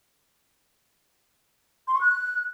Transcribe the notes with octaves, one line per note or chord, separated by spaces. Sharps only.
C6
C#6
F#6